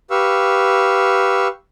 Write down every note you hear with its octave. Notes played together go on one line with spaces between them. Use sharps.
G4 B4 F5 C#6 E6